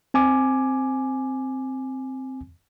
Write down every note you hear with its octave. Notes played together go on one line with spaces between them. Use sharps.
C4 G#5 D6